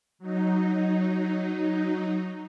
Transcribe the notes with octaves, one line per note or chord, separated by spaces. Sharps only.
F#3 D#4